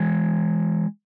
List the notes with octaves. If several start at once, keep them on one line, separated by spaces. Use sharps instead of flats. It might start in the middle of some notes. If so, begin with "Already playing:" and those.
Already playing: E3 G#3